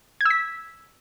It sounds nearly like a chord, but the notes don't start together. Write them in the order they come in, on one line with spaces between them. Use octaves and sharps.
G#6 E6 B6